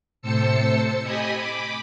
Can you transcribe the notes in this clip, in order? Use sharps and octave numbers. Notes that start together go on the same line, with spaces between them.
A2 C3 C5 A5 E6 C#7
G4 D#5 G#5 B5 D#6
B5 D6